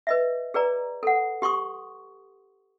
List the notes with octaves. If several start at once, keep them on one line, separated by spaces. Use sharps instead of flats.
B4 D#5 E5
G#4 B4 D5 A#5
A4 F#5
G4 C6 C#6 D#6